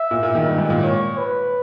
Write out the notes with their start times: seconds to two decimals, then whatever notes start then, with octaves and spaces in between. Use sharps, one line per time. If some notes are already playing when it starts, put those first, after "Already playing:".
Already playing: E5
0.11 A#2
0.23 A#2
0.35 D#3
0.46 G2
0.58 G#2
0.70 A#2
0.83 C#5
1.18 B4